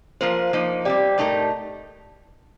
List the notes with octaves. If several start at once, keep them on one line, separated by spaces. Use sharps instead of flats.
F3 A#3 F4 A#4 C5
F3 A#3 D#4
G3 C4 G4 D5
A2 A3 D#4 G4 A#4